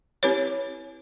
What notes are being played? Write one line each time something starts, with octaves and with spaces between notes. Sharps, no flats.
C4 E4 G4 B4 C#5